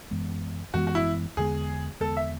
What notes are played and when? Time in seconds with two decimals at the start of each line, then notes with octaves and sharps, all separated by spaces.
0.11 F#2 E3 G#3 B3
0.74 F#2 E3 G#3 B3 F#4
0.87 F#4
0.95 E4
1.37 E2 D3 G#3 B3 G#4
2.00 E2 D3 G#3 B3 A4
2.17 E5